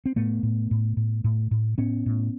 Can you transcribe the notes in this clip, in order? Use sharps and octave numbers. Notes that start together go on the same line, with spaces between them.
C4
A2 A3 B3
A2
A2
A2
A2
A2
A2 B3 C#4
A2